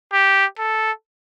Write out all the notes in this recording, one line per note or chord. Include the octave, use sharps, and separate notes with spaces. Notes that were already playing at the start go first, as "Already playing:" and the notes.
G4
A4